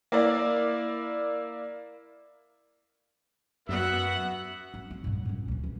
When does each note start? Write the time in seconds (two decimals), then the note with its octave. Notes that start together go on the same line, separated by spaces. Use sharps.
0.12 A#3 E4 D5
3.69 F#2 B3 F#4 E5 F#5
4.74 C#4
4.90 C4
5.04 G2 A#2
5.25 A#2 C#4
5.48 D2 F3
5.64 E3